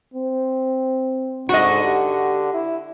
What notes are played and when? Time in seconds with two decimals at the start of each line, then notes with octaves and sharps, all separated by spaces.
0.14 C4
1.49 G#2 D3 F#4 D#5
1.84 G4
2.54 E4